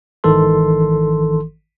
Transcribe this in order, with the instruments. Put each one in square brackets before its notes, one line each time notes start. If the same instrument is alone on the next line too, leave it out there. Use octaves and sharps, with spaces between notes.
[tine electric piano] G#1 D#3 E3 A4 C6